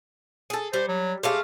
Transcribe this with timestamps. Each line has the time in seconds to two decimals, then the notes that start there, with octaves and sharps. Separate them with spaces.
0.50 G#4 A4
0.73 G3 C5
0.88 F#3
1.23 G#3 A3 G4 F5